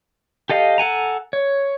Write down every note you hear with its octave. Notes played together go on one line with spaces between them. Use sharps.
G4 A4 D#5 F5
A4 F#5 G#5 A#5
C#5